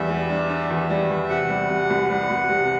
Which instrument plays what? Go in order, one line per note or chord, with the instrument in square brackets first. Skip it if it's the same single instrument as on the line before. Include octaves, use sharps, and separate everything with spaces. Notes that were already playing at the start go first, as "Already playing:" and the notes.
Already playing: [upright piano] E2 G3 [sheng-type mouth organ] E5
[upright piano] G3
D4
D4
E2
G3
E2
[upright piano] C3 [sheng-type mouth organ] F#5
[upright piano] G3
C3
C2
G3
C2
C3